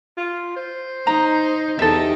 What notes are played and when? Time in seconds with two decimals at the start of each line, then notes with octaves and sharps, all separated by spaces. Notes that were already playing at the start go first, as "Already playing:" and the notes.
0.17 F4
0.56 C5
1.07 D#4 A#5
1.79 E2 D#4 G4 A4 E5